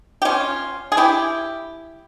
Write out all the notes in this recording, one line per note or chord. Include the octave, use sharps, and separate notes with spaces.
G4
C#4 F4
G#4
E4 G4